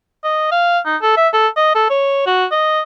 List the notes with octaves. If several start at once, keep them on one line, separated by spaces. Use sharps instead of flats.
D#5
F5
D#4
A4
E5
A4
D#5
A4
C#5
F#4
D#5